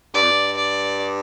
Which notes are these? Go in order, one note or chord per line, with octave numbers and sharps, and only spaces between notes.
G2 D5
F2
G2
D5